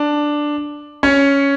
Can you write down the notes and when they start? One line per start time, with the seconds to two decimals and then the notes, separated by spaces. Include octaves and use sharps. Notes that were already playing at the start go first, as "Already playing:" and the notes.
Already playing: D4
1.03 C#4 C#5